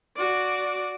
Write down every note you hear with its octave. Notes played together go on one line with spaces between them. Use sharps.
F#4 D5